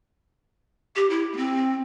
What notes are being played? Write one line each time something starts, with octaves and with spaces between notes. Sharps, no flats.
G4
E4
A#3
C4